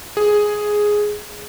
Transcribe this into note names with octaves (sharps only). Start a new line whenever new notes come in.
G#4